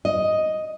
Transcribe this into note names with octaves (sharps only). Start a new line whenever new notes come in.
D#5